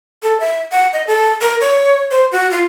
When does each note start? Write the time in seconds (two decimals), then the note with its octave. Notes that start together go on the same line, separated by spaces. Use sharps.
0.23 A4
0.40 E5
0.72 F#5
0.93 D#5
1.07 A4
1.41 A#4
1.61 C#5
2.11 C5
2.32 F#4
2.51 F4